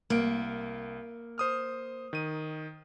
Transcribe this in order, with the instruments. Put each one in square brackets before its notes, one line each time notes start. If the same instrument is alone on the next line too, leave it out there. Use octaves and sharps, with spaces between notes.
[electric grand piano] C2 D7 [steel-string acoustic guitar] A#3
[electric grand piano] C5 D#6 F6
D#3 D#7